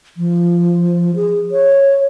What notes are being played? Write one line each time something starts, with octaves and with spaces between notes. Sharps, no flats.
F3
G#4
C#5